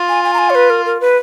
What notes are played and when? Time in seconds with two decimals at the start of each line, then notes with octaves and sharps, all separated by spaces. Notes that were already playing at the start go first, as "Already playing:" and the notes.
Already playing: F4
0.09 G#5
0.24 G#5
0.33 A#5
0.38 G#5
0.50 C#5
0.55 B4
0.70 A#4
0.85 A#4
1.00 B4